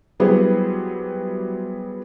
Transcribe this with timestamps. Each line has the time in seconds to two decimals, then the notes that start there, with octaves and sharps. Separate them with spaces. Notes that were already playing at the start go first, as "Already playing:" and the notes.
0.20 F#3 G3 B3 E4 G#4 C5